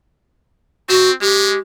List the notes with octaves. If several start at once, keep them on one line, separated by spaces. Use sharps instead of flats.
C4 F#4
G#3 G4